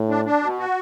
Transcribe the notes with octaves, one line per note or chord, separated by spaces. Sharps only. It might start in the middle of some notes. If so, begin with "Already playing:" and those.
Already playing: A2
D4
D4
B2
F#4